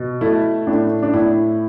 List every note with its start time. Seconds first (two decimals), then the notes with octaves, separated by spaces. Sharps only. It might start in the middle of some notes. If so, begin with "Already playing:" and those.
Already playing: B2
0.21 A3 E4
0.67 A2 D4
1.03 D4
1.14 A2 E4